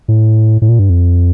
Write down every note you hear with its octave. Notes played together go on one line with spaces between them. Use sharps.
A2
A2
A#2
G2
F2